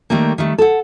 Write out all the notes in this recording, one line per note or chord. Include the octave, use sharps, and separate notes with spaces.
D#3 G3 A3 A#3
D#3 G3 A3
A4 F#5